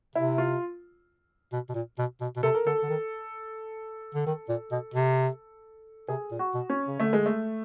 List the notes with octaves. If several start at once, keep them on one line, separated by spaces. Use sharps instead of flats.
C3 E4
F4
B2
B2
A#2
B2
B2
B2
C3 A4
A#4
D3 A4
D3
D#3
D3
D#3
A#2
B2
C3
C3 G#4
A#2
F#4
B2
C#4
C#3
D3 A3
G#3
A3